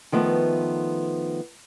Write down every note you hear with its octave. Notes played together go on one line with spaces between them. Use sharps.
D#3 F3 A3 B3